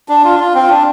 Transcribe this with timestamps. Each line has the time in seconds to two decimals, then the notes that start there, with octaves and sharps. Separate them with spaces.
0.09 D4
0.25 F4
0.34 D4
0.40 F4
0.54 C4
0.62 F4
0.70 D4